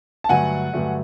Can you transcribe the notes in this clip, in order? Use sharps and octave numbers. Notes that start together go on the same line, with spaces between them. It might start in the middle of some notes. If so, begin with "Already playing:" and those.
A5
G2 D3 F#3 A3 F#5 G#5
G2 D3 F#3 A3